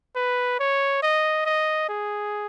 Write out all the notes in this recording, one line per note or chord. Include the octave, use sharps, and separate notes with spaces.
B4
C#5
D#5
D#5
G#4